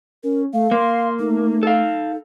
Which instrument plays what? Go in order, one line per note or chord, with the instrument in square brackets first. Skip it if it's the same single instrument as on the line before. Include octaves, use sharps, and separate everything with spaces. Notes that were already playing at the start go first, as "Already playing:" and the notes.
[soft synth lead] C#4 [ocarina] A#4
[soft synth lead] A3 [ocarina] F5
[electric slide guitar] A#3 [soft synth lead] C6
[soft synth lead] A3 [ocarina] D#4
[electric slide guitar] A4 F5